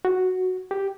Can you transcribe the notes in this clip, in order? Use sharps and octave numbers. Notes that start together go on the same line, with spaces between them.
F#4
G4